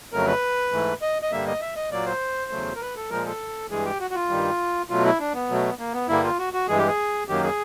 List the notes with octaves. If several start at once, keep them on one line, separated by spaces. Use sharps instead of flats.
F2 C#3 F#3 A3 A#4
B4
G#2 E3 A3
D#5
D#5
G2 D3 G3 A#3 E5
D#5
E5
D#5
A#2 F#3 A#3 D5
C5
E2 C#3 F#3 A3
A#4
B4
A4
A#2 F3 G#3 A#4
A4
G2 E3 G#3 G#4
G4
F#4
F#4
F4
G2 D#3 G3
B2 F#3 A3 F4
E4
D4
B3
B2 F#3 A3
A#3
B3
G2 D3 G3 A#3 E4
F4
F#4
F#4
G2 E3 G#3 G#4
G4
G#4
F#2 D#3 F#3 A#3 G4
G#4